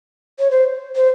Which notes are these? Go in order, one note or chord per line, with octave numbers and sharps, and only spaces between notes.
C#5
C5
C5